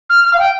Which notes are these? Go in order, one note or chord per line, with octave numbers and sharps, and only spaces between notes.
F6
F6
F5
G5